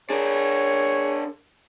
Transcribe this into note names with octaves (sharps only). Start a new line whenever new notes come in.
D4 G#4 A#4 C#5